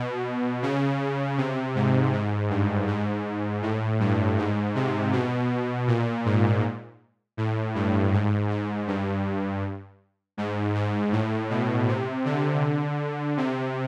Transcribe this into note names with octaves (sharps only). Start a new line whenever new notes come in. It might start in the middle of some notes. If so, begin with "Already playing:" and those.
Already playing: B2
C#3
C3
G#2
G#2
G2
G#2
A2
G2
G#2
C3
B2
A#2
G#2
A2
G2
G#2
G#2
G2
G#2
G#2
A2
B2
C3
D3
C3